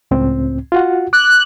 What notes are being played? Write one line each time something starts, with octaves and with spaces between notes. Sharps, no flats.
C#2 A2 C4
F4 F#4 F#5
D6 F#6